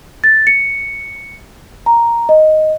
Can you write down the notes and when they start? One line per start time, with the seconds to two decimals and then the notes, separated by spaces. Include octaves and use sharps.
0.24 A6
0.47 C#7
1.86 A#5
2.29 D#5